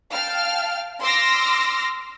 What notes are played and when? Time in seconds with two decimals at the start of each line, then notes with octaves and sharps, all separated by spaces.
0.13 F5 G5 A5 F6
1.02 C6 D6 E6 F6 A#6